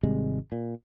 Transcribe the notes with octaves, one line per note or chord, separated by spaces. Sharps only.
G#1 C3 G3 G#3
A#2